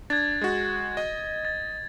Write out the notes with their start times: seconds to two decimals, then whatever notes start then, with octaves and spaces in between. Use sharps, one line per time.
0.10 D4 G#6 A6
0.41 G#3 F#4
0.97 D#5
1.45 A6